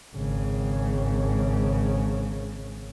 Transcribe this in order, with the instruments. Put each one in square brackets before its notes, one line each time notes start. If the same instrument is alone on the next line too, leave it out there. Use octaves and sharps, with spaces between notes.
[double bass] G#1 C#3